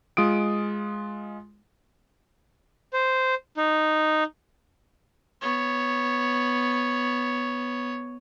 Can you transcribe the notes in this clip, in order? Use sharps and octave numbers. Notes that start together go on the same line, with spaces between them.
G#3 F4 D#6 D7
C5
D#4
B3 C#5